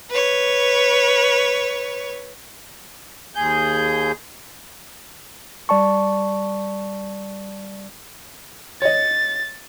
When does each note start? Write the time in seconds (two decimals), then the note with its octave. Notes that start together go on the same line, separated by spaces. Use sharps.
0.10 B4 C#5
3.35 D#2 G#4 G6
5.69 G3 D5 A5 C#6
8.82 C#5 D#5 A6